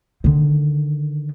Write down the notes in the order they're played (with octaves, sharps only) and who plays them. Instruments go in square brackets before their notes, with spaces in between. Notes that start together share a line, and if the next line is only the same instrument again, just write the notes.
[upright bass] D3 D#3